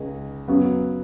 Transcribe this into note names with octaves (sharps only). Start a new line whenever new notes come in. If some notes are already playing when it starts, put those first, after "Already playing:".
Already playing: C#2 C#3 G#3 D#4
F#2 C#3 F#3 B3